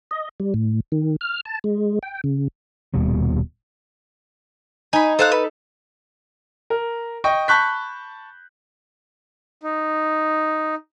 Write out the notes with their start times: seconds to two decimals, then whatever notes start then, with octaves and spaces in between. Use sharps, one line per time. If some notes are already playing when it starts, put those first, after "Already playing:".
0.11 D#5
0.40 G3
0.54 A2
0.92 D#3
1.21 F6
1.45 A5
1.64 G#3
2.03 G5
2.24 C#3
2.94 D#1 D#2 B2 G3
4.93 D#4 G#5 B5
5.19 A4 C5 F5 F#6
5.32 B4
6.70 A#4
7.24 D#5 G5 C#6
7.48 A5 B5 C#6 F#6 G6 B6
9.62 D#4